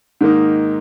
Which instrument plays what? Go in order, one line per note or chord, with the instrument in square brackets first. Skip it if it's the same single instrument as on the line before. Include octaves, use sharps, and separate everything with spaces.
[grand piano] G#2 D#3 A#3 D#4